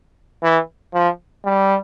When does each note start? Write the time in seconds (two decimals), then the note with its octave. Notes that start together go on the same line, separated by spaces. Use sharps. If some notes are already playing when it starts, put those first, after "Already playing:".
0.43 E3
0.93 F3
1.45 G3